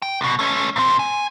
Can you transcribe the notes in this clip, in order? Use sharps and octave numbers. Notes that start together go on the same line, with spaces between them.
G5
C2 B2
A3 C#4
A#2 C4
G#5